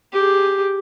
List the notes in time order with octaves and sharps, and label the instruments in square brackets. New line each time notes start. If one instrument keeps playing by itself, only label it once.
[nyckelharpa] G4 G#4